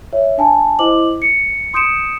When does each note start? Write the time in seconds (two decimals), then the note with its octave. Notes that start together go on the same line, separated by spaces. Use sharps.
0.13 C#5 E5
0.38 D4 G#5 A5
0.79 E4 C5 D#5 D6 F#7
1.22 C#7
1.74 C6 D#6 G6 C#7 D7 E7